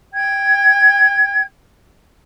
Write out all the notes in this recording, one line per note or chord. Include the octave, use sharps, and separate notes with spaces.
G5 G#6